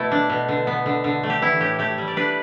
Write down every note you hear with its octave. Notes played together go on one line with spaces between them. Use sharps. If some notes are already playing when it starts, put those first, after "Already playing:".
Already playing: B2 A3 E4
D4
B2
D3
B3
D3
D3
A3
G4
E3 E4
A2 G4
A3 G4
G3
D5
D4 B4